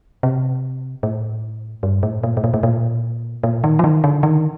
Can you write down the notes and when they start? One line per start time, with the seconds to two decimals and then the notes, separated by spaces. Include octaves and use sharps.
0.23 C3
1.03 A2
1.83 G2
2.03 A2
2.23 A#2
2.37 A2
2.44 A#2
2.54 A2
2.63 A#2
3.43 A#2
3.64 D#3
3.79 F3
3.84 D#3
4.04 D3
4.23 D#3